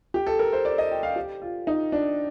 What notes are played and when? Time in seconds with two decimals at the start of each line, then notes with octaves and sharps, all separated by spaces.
0.14 G4
0.27 A4
0.39 A#4
0.53 C5
0.65 D5
0.78 D#5
0.91 G5
1.03 F5
1.16 G4
1.42 F4
1.67 D#4
1.92 D4